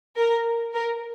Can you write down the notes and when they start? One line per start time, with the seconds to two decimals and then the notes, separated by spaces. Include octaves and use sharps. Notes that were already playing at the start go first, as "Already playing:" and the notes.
0.16 A#4
0.74 A#4